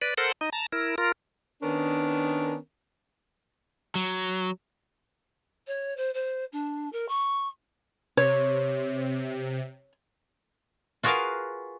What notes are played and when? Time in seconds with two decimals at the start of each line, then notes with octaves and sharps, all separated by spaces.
0.02 B4 D5
0.18 A4 A#4 C5 F#5 C6
0.41 D#4 D#5
0.53 A5 A#5
0.72 E4 A#4
0.98 F4 A#4
1.63 D#3 B3 C#4 D4 A#4
3.95 F#3
5.67 C#5
5.97 C5
6.14 C5
6.52 D4
6.93 A#4
7.09 C#6
8.17 C3 C#5
11.03 F4 F#4 G#4 A#4 B4 F5